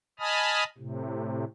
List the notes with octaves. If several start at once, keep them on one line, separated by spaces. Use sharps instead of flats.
D#5 G#5 A5 B5 D#6 F6
A2 C3